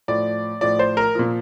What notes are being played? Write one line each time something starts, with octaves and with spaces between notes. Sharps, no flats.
A2 F3 D5
A2 F3 D5
C5
A#4
A#2 F3